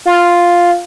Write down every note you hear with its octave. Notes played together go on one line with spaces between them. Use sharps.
F4